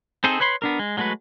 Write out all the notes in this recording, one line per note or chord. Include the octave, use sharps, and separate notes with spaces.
C4 D#4 G#4 A4 C5
B4 C#5 B5 C6
B3 D4 A#4
G#3
F#3 G#3 A3 F#4 B4